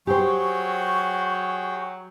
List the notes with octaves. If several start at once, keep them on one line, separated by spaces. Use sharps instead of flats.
F#3 G4 G#4 C5 G5 C#6